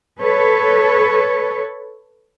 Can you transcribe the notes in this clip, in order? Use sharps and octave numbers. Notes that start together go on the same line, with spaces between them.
A4 B4 C#5